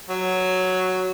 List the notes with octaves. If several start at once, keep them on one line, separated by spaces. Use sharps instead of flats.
F#3